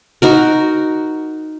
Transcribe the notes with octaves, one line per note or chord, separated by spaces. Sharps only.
D#4 F#4 A#4